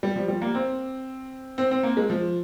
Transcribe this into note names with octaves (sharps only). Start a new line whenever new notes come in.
G3
F3
G3
A#3
C4
C4
C4
A#3
G#3
F3